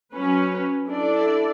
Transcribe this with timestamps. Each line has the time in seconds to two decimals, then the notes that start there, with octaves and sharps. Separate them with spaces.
0.13 F#3 C#4 B4
0.87 D4 E4 A4 D5